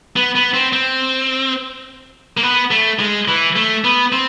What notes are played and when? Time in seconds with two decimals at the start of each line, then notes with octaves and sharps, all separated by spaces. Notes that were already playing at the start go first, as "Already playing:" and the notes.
0.16 B3
0.36 B3
0.54 C4
0.73 C4
2.37 A#3
2.43 B3
2.71 A3
2.99 G#3
3.28 E3
3.56 A3
3.84 B3
4.12 C4